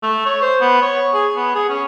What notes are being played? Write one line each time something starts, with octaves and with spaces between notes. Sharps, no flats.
A3
C#5
C5
B3
C#5
G#4
B3
G#4
C#4